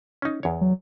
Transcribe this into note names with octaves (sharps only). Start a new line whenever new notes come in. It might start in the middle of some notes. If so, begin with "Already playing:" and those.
C#4 D#4
E2 C#5
F#3